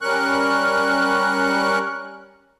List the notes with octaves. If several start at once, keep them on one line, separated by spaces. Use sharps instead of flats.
G3 C#4 A#4 C#6 F#6